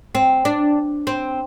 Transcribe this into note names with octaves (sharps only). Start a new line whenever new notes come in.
C4
D4
C4